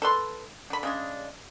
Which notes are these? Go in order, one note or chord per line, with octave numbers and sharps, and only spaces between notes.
A4 B4 C6
D3 B5
C#3 G#3 D4